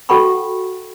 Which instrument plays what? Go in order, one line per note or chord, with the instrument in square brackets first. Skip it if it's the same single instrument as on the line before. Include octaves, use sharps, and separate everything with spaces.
[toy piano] F#4 A4 F#5 G5 B5 C#6